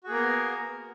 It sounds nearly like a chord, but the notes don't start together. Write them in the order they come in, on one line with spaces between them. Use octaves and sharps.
F#4 G#4 A#3 A#4 B3